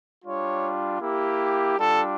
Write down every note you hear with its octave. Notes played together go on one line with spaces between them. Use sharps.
G3 D4 F4 C#5
A#3 E4 G4
G3 D4 F4 A4